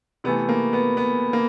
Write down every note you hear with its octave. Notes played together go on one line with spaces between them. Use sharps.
C3 E3 A3 B3
A#3
B3
B3
A#3